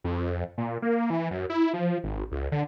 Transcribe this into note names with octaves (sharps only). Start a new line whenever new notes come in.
F2
A#2
A#3
E3
F#2
E4
F3
G#1
C#2
D3